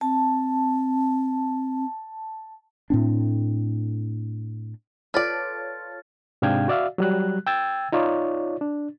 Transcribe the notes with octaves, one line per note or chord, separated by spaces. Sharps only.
C4 A5
A2 C4 D4
F4 A4 B4 C#5 D5 F6 A6
G#2 C3 D4 F5 G5 G#6
F#4 D5 E5 F5
F#3 G3 F#6
G5 E6 G#6 A6
D#4 F4 C#5 D5
D4